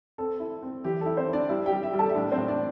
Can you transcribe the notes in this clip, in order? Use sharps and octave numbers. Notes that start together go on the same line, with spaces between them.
C4 A4
E4
C4
E3 G4
E4 A4
C4 C5
E4
D4 D5
G3 E4 E5
G4 G5
G3
E4 E5
G3
A4 A5
E5
A2 D4 D5
C4 C5
A2
D4 D5